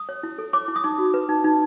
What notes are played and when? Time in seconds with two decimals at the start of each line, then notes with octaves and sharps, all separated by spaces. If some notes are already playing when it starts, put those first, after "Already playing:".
Already playing: D#6
0.09 C#5
0.23 E4
0.38 A4
0.53 C#5 D6
0.68 E4
0.76 D#6
0.84 D#4 D6
0.98 F#4
1.14 B4
1.29 D#4
1.44 D#4